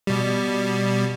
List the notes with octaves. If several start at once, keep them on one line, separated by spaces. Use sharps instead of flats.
B2 G3